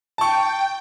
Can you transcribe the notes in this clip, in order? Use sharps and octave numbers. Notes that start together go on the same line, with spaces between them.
G5 A5 C#6